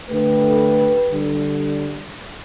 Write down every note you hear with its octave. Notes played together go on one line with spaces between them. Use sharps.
D3 A3 G4 B4
D3 G3